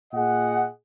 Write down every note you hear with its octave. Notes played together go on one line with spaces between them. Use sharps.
A#2 G#4 D#5 F#5